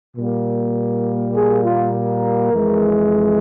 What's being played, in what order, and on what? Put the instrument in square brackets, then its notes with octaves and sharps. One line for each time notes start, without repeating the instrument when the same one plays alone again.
[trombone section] A#2 G3 A#3
G#4
F4
A#4
F2 E3 G#3